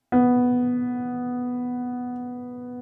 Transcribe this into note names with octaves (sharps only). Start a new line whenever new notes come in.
B3